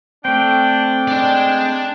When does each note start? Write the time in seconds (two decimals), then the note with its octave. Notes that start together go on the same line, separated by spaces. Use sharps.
0.25 A3 C4 D4 G5
1.08 G#3 D4 D5